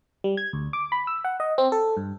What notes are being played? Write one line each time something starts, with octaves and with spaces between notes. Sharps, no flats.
G3
G#6
D2
D6
B5
E6
F#5
D#5
C4
A4
G2